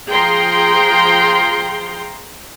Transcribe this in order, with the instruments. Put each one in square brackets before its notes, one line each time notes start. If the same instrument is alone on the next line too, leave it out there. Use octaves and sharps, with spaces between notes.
[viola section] F3 G#4 G5 A#5 C6